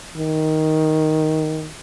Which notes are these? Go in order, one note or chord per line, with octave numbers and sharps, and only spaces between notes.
D#3